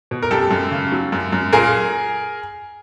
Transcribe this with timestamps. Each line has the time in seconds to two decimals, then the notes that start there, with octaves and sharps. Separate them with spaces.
0.11 B2
0.22 A#4
0.31 F#2 G4 A4
0.51 F#2
0.71 C#3
0.92 F#3
1.12 F#2
1.33 F#2
1.53 A#2 G#4 A#4